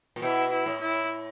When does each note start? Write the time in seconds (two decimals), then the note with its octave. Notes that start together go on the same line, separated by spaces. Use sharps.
0.16 A#2
0.22 B2 E4
0.52 E4
0.66 A2
0.80 E4